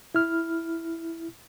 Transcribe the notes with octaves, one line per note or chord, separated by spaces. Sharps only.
E4 F6